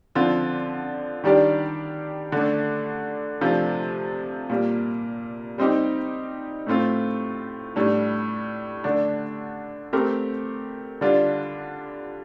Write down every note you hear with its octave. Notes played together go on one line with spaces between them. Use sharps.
D3 F3 C4 F4
D#3 G3 D4 G4 D5
D3 A3 D4
C3 F3 A3 D4 F4
A#2 G3 A#3
G3 C4 D#4 G4
A2 A3 C4 F4
A2 G3 D4
D3 A3 D4
A3 C4 G4 A#4
D3 G3 D4 F4